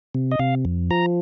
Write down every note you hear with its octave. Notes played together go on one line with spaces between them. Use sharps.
C3
D#5
C3 F5
F2
F3 A#5